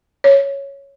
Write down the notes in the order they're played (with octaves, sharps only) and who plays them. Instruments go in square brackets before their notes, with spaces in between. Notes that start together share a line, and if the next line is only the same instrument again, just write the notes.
[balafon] C#5